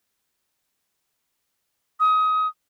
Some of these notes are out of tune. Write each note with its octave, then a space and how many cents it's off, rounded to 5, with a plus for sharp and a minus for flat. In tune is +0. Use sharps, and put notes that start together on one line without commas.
D#6 +25